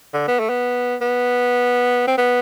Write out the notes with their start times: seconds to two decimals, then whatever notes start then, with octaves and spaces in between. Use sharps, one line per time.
0.14 D3
0.28 B3
0.40 A3
0.50 B3
1.01 B3
2.08 C4
2.18 B3